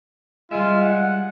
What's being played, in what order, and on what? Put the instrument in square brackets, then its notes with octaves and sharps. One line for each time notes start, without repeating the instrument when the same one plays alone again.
[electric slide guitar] G3 E5 [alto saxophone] G#3 [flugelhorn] F4
[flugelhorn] F#5